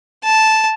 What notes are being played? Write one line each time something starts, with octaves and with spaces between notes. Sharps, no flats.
A5